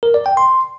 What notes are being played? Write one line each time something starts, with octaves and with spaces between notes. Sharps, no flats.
A#4
D5
G5
C6